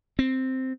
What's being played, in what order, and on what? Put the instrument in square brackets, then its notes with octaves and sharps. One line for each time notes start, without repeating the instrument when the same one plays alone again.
[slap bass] C4